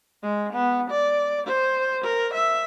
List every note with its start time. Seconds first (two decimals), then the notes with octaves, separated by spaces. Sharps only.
0.22 G#3
0.53 B3
0.90 D5
1.47 C5
2.04 A#4
2.34 E5